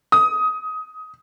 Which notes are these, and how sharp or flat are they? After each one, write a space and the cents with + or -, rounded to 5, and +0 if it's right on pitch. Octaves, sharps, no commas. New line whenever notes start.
D#6 +20